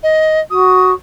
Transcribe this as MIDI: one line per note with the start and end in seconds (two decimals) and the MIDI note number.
0.03 0.40 75
0.50 0.93 66
0.50 0.92 87